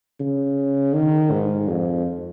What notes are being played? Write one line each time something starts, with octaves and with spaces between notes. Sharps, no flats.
C#3
D#3
G#2
F2